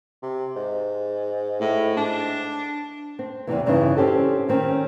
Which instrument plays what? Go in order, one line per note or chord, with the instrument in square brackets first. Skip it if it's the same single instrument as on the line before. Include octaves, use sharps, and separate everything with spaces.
[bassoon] C3
G#2
[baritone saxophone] A2
D4
[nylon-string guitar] C4
E2 G#2 C3 E3
G2 C#3 E3 D4 D#4
C4 C#4 G4 A4
D#3 C4 C#4